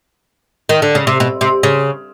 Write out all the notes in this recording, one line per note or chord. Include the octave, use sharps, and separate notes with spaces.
D#3
D3
C#3
C3
B2
C3
C#3